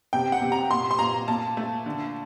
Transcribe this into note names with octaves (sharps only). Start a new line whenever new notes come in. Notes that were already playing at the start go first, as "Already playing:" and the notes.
C3 G5
F#5
C3
A#5
A#2 C6
C6
A#2 A#5
A#2 A5
A3
D3